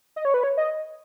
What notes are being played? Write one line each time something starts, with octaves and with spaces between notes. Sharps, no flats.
D#5
C#5
B4
C#5
D#5